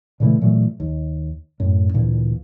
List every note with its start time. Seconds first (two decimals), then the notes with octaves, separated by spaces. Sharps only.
0.20 A#2 C#3 E3 A3
0.41 A#2 E3 F#3 A3
0.80 D#2
1.60 F#2 A2
1.94 D2 A#2 E3